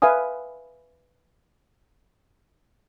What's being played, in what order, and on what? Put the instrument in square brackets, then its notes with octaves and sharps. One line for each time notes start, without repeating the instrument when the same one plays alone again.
[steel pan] B4 E5 F5 G#5 D#6